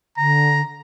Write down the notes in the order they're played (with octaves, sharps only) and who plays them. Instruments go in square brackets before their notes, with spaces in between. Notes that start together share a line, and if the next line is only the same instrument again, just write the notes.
[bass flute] D3 [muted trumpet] A#5